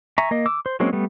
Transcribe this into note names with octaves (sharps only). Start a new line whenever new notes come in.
E5 G#5 A#5 C#6
A#3 D#5
D6 E6
C5
F#3 G#3 A#3 C4 C#4
G3 A3 B3